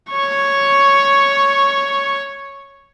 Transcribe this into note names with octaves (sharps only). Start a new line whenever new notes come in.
C#5 C#6